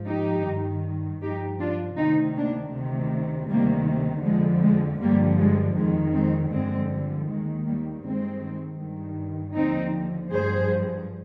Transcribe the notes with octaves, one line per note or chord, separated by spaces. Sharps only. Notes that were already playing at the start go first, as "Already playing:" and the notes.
Already playing: G#2 F3
D#4 G4
G2 D#3
G2 F3 D#4 G4
D4 F4
D2 C3 D#3 C4 D#4
A#3 D4
D2 C3 D#3
D2 C3 D#3 G3 A#3
F2 D3 F3 G#3
G#3
G2 D3 F3 G3 A#3
G#3
F2 D#3 G#3
G#3 C4
G2 D3 F3 G#3 C4
D#2 D#3 G#3
G3 A#3
G2 D#3 G#3 C4
G2 D#3
D#2 D3 F3 C4 D#4
G2 F3 G#4 C5